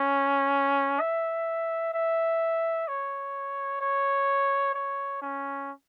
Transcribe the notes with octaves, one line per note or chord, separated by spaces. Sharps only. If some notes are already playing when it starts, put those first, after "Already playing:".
Already playing: C#4
E5
E5
C#5
C#5
C#5
C#4